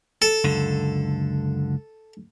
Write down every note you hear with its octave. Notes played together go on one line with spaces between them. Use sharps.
A4
C#2 F#2 D3